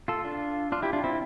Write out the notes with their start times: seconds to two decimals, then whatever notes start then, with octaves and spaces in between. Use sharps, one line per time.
0.08 F4 A4
0.24 D4 F4
0.72 D4 F4
0.83 E4 G4
0.93 D4 F4
1.04 C4 E4